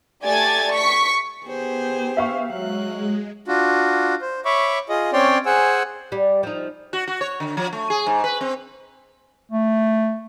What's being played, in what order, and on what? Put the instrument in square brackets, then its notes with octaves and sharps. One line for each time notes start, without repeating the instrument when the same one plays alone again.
[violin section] A3 G4 D5 G#5 G#6 A6
C#6 B6 C#7
[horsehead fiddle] B3 G4 [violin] G#4 C5
[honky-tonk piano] E5 F5 C#6
[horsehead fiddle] F#3 [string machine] G#3 [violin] F#6
[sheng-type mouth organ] D4 F4 F#4
C5
C#5 E5 B5 C#6 D6
F4 G#4 D#5
C4 C#4 C#5 D5 G5 C6
G#4 C5 F#5 G#5 E6
[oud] G3
F3 D#4
[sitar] F#4
F#4
C#5
D3
F3
A3
G#4
G#2
B4
C4
[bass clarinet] A3